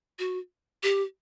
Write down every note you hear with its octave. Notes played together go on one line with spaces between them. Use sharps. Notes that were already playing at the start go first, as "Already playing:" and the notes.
F#4
G4